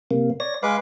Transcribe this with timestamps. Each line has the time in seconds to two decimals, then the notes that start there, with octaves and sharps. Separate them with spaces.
0.11 C3 A#3
0.40 C#5 D5 A#6
0.63 G#3 B4 F5 D6